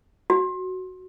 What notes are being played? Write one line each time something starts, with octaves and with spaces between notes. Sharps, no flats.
F#4